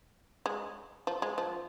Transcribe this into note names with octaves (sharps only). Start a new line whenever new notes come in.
G#3
F3
G#3
F3